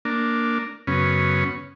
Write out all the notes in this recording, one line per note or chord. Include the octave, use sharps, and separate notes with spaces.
A#3 D4
F#2 C#3 B3 C#4